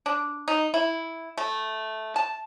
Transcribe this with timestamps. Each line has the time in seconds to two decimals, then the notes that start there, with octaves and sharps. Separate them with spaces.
0.06 D4
0.48 D#4
0.74 E4
1.37 A3
2.16 A5